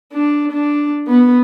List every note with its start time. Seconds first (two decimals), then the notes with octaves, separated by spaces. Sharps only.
0.13 D4
0.52 D4
1.07 B3